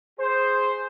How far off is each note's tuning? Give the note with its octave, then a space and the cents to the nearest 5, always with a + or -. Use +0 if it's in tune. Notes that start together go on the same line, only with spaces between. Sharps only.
G#4 +0 C5 +0